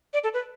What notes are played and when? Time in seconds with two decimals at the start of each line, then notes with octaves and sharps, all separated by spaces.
0.14 D5
0.24 A4
0.34 B4